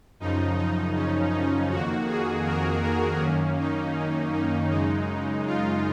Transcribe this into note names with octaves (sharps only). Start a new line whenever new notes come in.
F#2 C#3 F3 D#4
D#4
C#4
D#4
F2 D#3 A#3 F#4
G#4
A#4
A#4
F#2 D#3 A#3 C#4
D#4
C#4
D#4
F#2 C#3 G#3 D#4
F4